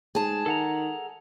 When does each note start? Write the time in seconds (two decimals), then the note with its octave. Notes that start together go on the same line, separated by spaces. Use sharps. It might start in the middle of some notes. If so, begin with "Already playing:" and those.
0.15 G#2 G#4 A5
0.46 D#3 A4 F#5 A#5